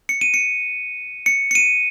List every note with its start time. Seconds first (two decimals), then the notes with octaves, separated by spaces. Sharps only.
0.09 C#7
0.21 D#7
0.34 C#7
1.26 C#7
1.51 C#7
1.55 D#7